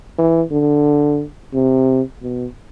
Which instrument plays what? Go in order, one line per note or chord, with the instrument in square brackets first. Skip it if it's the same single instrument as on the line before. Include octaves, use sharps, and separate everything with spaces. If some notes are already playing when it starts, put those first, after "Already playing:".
[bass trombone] E3
D3
C3
B2